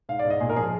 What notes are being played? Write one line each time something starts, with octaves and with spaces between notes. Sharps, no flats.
G#2 F5
D5
G#2
D#5
A#2 G#4
A#4
F3 G#4